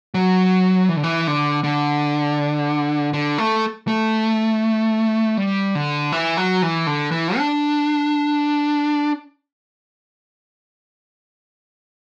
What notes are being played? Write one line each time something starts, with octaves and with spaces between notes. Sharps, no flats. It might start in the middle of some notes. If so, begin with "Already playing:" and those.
F#3
E3
D3
E3
D3
D3
D3
A3
A3
G3
D3
E3
F#3
E3
D3
E3
D4